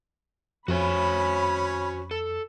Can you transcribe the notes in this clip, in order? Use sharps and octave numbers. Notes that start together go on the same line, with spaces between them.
F2 C#4 F#4 C5 C#5 G#5 B5
A4